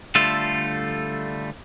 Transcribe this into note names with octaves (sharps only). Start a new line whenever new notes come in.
D3 G3 A3 F4 A4